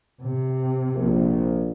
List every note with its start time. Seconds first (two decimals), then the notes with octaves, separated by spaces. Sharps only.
0.22 C3
0.95 A#1